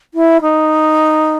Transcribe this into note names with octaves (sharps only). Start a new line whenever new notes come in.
E4
D#4